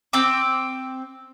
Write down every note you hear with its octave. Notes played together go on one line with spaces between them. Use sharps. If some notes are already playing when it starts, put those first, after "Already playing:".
C4 G5 D6